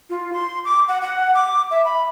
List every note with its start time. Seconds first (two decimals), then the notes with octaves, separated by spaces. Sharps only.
0.10 F4
0.33 C6
0.65 D6
0.88 F#5
1.02 F#5
1.35 D6
1.71 E5
1.85 B5